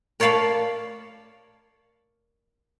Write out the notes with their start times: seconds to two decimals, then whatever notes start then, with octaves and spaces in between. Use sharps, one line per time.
0.20 A#4 C#5 D5 F5 A5 B5